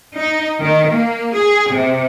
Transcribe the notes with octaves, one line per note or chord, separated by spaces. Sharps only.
D#4
D#3
A#3
G#4
C3